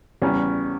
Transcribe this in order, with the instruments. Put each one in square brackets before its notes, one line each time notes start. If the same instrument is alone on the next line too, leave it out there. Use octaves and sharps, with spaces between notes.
[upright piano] E2 C#3 G3 C#4